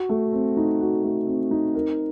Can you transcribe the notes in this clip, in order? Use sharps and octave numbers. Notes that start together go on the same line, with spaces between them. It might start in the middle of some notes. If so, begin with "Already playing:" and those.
Already playing: F#4
A3
C4
D#4
F#4
A3
C4
D#4
A#4